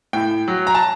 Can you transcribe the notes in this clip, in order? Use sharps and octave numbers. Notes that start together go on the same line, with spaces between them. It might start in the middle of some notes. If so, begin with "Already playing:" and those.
A2 G5
F#3
A#5
A5